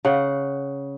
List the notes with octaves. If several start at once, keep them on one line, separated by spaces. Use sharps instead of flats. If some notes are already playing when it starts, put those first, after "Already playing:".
C#3 F#5